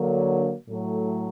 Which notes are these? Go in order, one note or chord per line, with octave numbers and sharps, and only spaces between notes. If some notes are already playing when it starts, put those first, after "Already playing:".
Already playing: D3 F#3 A#3
A2 F#3 A3